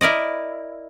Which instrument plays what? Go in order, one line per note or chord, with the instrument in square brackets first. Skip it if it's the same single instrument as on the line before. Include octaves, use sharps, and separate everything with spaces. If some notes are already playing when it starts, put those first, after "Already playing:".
[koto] E4 A#4 D5 D#5